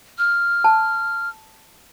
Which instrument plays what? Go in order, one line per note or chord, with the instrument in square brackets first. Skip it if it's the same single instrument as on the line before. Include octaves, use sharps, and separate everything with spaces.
[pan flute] F6
[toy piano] A5